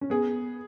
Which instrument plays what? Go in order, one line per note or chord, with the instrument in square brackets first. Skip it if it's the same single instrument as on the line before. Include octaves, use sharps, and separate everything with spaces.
[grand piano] C#4
[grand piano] B3 [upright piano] G#4